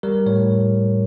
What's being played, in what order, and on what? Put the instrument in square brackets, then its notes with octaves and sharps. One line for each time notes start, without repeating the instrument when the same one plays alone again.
[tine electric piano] G3 A#4
A2 C#5